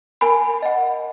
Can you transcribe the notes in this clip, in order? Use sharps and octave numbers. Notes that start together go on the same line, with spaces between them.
A#4 G#5 B5
D#5 F#5